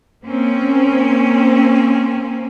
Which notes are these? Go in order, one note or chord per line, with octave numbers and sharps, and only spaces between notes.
A#3 C4 C#4